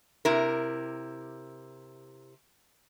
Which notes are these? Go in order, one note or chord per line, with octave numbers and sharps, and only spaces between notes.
C3 E4 A#4